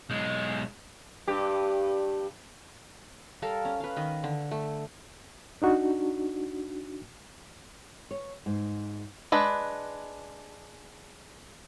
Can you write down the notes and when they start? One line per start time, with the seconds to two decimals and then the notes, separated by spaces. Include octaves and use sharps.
0.10 B1 G#3
1.28 G2 G4
3.42 G3 A4 A#4 F5
3.65 C#4
3.80 B4 F5
3.96 D#3 D#5
4.24 D3
4.51 A3
5.62 D4 D#4 F#4
8.11 C#5
8.46 G#2
9.32 G#3 D4 B4